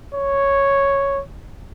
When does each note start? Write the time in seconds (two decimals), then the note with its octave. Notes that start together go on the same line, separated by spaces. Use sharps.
0.14 C#5